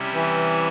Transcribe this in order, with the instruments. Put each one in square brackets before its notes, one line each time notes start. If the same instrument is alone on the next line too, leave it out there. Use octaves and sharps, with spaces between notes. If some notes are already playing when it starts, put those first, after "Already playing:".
Already playing: [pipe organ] C3 G3 C#4 E4
[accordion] E3